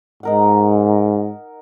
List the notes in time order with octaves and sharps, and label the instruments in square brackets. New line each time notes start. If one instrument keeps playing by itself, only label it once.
[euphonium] G#2 [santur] D#4 A#4 F#5